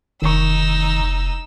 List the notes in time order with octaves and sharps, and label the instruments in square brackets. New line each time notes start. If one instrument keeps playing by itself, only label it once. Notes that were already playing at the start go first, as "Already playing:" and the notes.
[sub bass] F1 [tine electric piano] D#3 C#6 [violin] D#4 E6